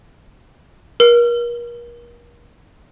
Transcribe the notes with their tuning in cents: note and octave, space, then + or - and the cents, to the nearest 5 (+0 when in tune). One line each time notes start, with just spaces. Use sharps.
A#4 +40